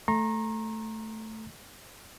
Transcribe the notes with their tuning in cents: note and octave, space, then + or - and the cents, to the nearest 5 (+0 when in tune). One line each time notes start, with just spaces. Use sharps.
A3 +0 A#5 +0 C#6 -45